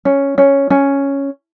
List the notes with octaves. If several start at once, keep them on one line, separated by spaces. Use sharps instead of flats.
C#4
C#4
C#4